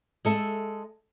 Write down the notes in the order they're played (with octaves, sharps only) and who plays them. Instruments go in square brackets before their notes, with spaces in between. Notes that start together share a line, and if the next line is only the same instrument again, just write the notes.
[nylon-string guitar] G#3 A4 E5